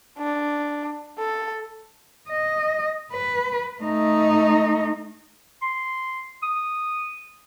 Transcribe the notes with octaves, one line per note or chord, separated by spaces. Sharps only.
D4
A4
D#5
B4
A3 D#4
C6
D#6